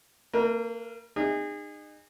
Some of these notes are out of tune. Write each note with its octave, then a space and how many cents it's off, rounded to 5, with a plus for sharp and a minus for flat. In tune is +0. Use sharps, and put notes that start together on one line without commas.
A#3 -35 A#4 +35
D#4 -35 G#4 -30